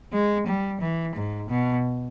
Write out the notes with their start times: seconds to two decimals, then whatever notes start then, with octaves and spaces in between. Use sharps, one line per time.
0.13 G#3
0.47 G3
0.81 E3
1.16 G#2
1.50 B2